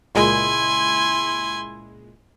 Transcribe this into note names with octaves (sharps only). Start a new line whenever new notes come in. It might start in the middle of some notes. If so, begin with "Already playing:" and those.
C#2 A#2 G#3 E4 G#5 C6